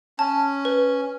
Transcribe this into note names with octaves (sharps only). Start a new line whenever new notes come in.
C#4 A5
B4